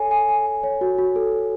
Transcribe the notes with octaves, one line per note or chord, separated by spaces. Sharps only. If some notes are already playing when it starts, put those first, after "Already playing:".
Already playing: A4 C#5 G#5
G#5
G#5
G#5
C#5
F#4
F#4
A4
A4